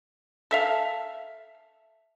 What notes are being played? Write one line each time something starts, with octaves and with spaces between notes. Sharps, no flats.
A4 E5 F5